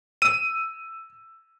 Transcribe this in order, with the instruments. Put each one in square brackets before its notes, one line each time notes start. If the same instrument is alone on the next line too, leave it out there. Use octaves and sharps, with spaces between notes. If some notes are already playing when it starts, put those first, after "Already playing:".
[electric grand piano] E6 D#7